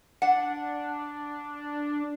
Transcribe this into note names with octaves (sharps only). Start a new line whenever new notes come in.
D4 F#5